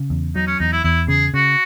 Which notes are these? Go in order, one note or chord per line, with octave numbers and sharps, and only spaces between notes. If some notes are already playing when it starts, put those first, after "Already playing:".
Already playing: C#3
E2
F#3 D#4
C#4
E2 D#4
E4
E2 E4
C#3 G#4
C#3 F#4